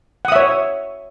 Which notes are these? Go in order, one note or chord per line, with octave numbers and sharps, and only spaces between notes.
C#5 E5 F#5 D#6